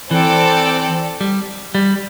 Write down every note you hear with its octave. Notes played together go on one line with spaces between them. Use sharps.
E3 C4 A4 D5 G5
G3
G3